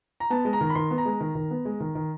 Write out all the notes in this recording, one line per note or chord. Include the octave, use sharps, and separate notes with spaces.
A#5
B3 A5
G#3
A#5
D#3
B5
D#3 C6
B3
A#5
G#3
D#3
D#3
B3
G#3
D#3
D#3